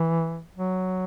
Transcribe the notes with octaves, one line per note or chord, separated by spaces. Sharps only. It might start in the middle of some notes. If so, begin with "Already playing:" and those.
Already playing: E3
F#3